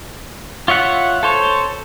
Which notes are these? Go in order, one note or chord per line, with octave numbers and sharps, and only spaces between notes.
F4 C#5 E5 F#5
A4 C5 C#5